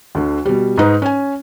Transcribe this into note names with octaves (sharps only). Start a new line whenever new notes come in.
D2 D3
B2 G3
G#2 D#4 B4
C#4 G#5